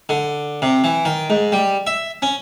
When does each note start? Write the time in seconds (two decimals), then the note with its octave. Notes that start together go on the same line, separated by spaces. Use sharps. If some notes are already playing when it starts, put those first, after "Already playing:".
0.09 D3
0.62 C3
0.84 E3
1.05 D#3
1.30 G#2
1.52 G3
1.87 E5
2.22 C#4